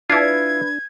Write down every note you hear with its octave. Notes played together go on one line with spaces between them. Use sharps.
D4 E4 F4 B4 G#6